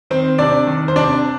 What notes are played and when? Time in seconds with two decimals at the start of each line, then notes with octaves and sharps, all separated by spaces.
0.10 D#3 C4 C5
0.38 C3 D4 D5
0.67 D#3
0.88 C5
0.96 C3 D4 D5